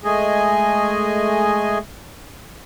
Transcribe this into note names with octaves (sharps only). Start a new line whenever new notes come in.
G#3 A3 G#4 D#5 G#5